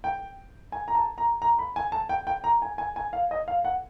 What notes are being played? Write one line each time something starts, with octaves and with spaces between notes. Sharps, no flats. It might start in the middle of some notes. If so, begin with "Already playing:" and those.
G5
G#5
A#5
A5
A#5
A#5
B5
G#5
A5
G5
G5
A#5
G#5
G#5
G#5
F5
D#5
F5
F#5